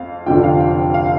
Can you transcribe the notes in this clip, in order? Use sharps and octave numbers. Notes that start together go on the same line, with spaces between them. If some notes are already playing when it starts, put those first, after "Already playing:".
Already playing: F2 F5
F1 F2 D3 F3 G5
F5
G5
F5